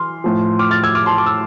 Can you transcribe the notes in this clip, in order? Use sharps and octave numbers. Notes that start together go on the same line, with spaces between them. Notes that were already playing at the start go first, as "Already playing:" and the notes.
Already playing: E3 C6 F6
A2 F3
D6 F6
F6 A6
E6 G#6
D6 F6
A5 C6
D6
E6